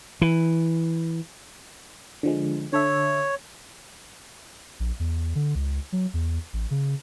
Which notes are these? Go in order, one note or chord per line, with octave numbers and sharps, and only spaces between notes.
E3
D3 F3 G#3
D3 A4 C#5 E5
A#1
E2
D3
C#2
F#3
E2
A1
C#3